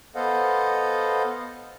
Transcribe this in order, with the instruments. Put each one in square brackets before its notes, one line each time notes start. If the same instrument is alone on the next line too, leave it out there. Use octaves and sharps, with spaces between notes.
[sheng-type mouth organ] B3 A4 C5 D#5 F5 F#5